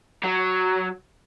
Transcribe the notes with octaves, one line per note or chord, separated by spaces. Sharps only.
F#3